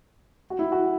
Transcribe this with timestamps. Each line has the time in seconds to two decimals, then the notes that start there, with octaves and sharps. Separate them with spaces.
0.50 F#4
0.59 E4
0.72 F#4